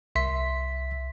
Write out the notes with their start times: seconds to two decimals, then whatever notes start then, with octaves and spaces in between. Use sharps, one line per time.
0.15 C2 E5 C6 B6